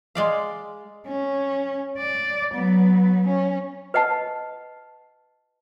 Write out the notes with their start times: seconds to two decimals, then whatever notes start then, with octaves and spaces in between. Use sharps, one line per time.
0.15 G#3 D5 F5
1.07 C#4
1.98 D5
2.55 F#3 B3
3.27 C#4
3.94 B4 D#5 F#5 A5